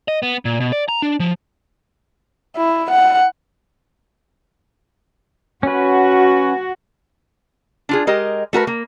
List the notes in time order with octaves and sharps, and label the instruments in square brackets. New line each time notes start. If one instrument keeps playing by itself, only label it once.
[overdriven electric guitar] D#5
B3
A#2
B2
D5
A#5
D4
F3
[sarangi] E4
F#5
[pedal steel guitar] C#4 B4 [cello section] F#4
[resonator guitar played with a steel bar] D4 F4 G#4
G#3 G4 A#4 D#5
A3 F#4 A#4 B4
A#3